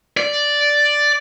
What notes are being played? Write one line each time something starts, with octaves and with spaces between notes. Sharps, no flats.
D5